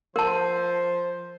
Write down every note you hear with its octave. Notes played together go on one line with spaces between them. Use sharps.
F3 A#4 C5 A5